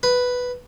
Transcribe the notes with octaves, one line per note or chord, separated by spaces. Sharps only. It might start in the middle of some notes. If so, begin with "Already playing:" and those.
B4